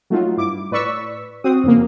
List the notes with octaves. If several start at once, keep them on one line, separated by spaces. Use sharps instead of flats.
F#3 A3 D#4 F4 F#4
G2 E4 D6
A2 B4 D5 C#6 E6 B6
C4 F#4 D#6
F2 C#3 A#3